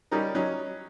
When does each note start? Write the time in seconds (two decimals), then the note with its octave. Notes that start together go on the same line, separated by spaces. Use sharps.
0.11 G3 C#4 D#4 A#4
0.35 F#3 C#4 D#4